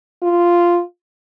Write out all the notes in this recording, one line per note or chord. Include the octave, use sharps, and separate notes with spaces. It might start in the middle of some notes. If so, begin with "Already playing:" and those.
F4